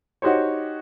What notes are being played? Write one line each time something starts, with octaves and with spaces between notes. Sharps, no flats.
D#4 F#4 G4 C5 C#5